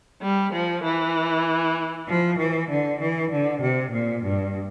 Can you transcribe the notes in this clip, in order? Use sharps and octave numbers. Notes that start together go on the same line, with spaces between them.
G3
F3
E3
F3
E3
D3
E3
D3
C3
A#2
G2